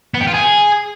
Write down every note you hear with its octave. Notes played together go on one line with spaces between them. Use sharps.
B3
G4
F4
G#4